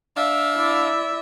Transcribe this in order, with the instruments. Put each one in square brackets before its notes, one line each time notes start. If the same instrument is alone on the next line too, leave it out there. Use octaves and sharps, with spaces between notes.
[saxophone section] D4 F5 [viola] E5
[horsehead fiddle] E4 D5